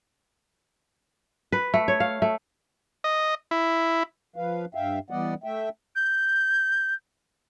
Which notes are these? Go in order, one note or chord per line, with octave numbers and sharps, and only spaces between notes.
B4
A3
C#5
F5
A3
D#5
E4
F3 B4 F5
G2 E5 F5 G5
E3 G3 B3 D5 D#5 F#5
A3 E5 G5
G6